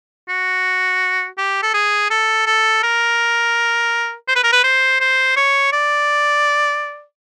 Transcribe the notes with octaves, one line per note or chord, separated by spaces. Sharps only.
F#4
G4
A4
G#4
A4
A4
A#4
C5
B4
A#4
B4
C5
C5
C#5
D5